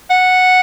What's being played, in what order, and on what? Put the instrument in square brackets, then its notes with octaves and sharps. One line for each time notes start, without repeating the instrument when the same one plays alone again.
[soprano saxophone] F#5